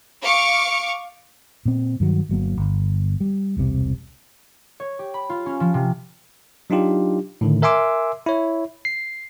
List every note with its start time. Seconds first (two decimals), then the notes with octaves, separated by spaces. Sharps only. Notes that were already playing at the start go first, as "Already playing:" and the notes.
0.23 F5 C#6 D6 C#7
1.65 A#2 C4
2.00 G2 D#3 F#3
2.29 G1 F#3 A#3
2.57 G1
3.20 G3
3.57 E1 C2 C3
4.80 C#5
4.99 G4
5.14 B5
5.30 F4
5.46 C#4
5.60 F3
5.74 C3
6.70 F#3 D4 D#4 F4 G4
7.41 A2 D3 D#3
7.62 A#4 E5 G#5 C6 D6 E6
8.26 E4 C#5
8.85 C7